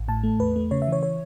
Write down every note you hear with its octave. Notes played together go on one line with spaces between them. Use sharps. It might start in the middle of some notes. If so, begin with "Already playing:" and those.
Already playing: A1
A2 A5
A3
E2 B4
A3
C#3 C#5
E5
E3
C#5
C#5